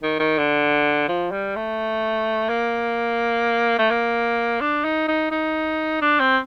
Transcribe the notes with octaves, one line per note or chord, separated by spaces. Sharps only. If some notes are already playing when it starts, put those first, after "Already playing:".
D#3
D#3
D3
F3
G3
A3
A#3
A3
A#3
D4
D#4
D#4
D#4
D4
C4